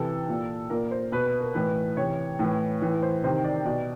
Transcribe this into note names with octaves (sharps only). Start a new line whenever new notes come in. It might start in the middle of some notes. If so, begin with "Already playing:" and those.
Already playing: C3 E3 A4
A#2
A#2 A#4
C5
B2 B4
B4
A#4
A2 E3 B4
C3 E3 C#5
A2 E3
A2 E3
C5
C3 D#3 C5
D5
B2 D5